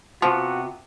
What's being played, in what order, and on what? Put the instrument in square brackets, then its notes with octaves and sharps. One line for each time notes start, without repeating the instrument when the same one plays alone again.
[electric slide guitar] C3 B3 [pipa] F3 [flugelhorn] F#4